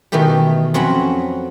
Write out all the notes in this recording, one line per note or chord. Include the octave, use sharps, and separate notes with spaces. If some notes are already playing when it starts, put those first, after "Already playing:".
B2 D#3 E3 A3 G4
F2 F#3 C4 C#4 F#5 B5